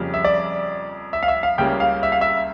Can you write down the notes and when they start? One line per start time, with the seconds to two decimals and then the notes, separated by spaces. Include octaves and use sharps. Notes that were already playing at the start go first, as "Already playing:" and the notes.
Already playing: F2 C#3 G3 A#3
0.14 E5
0.25 D5
1.13 E5
1.23 F5
1.28 E5
1.43 F5
1.58 C#2 C#3 G3 A#3 G5
1.80 F5
2.03 E5
2.12 F5
2.21 E5